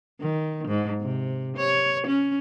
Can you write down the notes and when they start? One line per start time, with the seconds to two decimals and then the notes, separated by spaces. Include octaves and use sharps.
0.20 D#3
0.68 G#2
1.01 C3
1.57 C#5
2.07 C#4